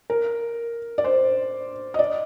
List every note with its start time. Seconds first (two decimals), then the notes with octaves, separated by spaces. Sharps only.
0.10 A#4
0.98 D5
1.04 C5
1.94 D#5
1.99 D5